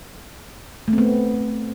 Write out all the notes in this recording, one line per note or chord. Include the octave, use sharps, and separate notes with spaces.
A3
C4
B3